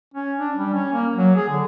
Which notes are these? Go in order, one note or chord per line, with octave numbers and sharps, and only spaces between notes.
C#4
D4
G3
C#4
A#3
F#3
G#4
D3